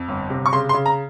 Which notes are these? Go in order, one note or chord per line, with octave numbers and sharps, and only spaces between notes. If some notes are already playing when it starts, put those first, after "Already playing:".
Already playing: F2
G1
C3
C#6
C#3 C6
C6
C#3
A#5